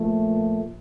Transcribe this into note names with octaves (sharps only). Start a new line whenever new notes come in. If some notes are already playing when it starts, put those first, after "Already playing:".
Already playing: A#2 F3 A3